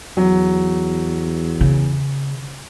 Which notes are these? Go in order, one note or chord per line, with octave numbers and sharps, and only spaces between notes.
E2 F#3
C#3